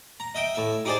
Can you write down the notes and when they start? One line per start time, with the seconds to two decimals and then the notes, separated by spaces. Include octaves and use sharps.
0.20 A#5
0.35 D#5 E5 G5
0.55 A2 E5
0.85 D#4 G4 G#4 C5 D5